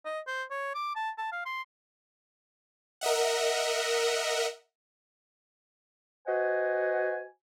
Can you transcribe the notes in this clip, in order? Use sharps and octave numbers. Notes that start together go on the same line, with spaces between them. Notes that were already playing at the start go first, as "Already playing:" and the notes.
D#5
C5
C#5
D6
A5
A5
F5
C6
A#4 D#5 E5 F#5
F#4 B4 C5 D#5 F#5 G#5